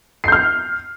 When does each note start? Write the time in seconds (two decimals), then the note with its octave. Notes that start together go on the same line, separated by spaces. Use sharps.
0.24 C7
0.28 G6
0.32 F6